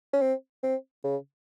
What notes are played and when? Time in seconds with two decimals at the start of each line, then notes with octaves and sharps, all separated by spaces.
0.13 C#4
0.21 C4
0.63 C4
1.04 C#3